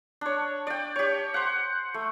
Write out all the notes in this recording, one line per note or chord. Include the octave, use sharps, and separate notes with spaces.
D4 C#5
D5 G5
G4 C#5
C5 F#5
A3